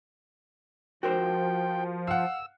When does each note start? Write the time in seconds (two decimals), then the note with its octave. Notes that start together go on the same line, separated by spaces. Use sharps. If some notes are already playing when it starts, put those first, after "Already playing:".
1.03 F3 F#4 A#4 C5 G5
2.07 F5 F#5 E6